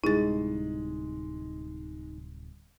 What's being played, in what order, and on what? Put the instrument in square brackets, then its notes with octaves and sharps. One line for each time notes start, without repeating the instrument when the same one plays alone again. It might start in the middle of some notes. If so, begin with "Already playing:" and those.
[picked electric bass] D1 C3 G3 [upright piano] G#3 [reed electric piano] D#4 [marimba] E4 A6